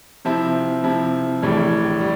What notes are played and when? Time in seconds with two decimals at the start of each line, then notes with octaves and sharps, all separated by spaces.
0.25 C3 F3 C4 E4
0.83 C3 F3 C4 E4
1.42 A#1 A2 E3 G3
2.01 G3